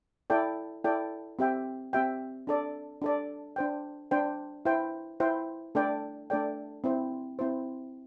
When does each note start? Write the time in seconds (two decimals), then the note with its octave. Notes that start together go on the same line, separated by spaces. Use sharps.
0.30 E4 A4 D5 G5
0.84 E4 A4 D5 G5
1.39 C4 G4 E5 G5
1.93 C4 G4 E5 G5
2.47 D4 A4 D5
3.02 D4 A4 D5
3.56 D4 C5 G5
4.11 D4 C5 G5
4.65 E4 C5 G5
5.20 E4 C5 G5
5.75 A3 D4 A4 D5 G5
6.30 A3 D4 A4 D5 G5
6.84 C4 E4 C5
7.39 C4 E4 C5